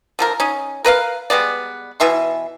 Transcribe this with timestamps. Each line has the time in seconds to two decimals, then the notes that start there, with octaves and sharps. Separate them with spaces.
0.19 D3 F3 A#4
0.40 C#4 D#4
0.84 A#4 B4 E5 F5
1.30 G3 G#3 B3 D5
2.00 B2 E3 E5 C6